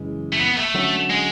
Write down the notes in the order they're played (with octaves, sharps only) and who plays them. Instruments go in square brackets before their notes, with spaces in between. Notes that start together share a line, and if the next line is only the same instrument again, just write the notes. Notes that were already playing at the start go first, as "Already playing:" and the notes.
Already playing: [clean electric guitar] F#2 C#3 E3 G#3
[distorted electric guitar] A3
B3
A3
[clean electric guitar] D3 F#3 C#4 F#4
[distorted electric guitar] G#3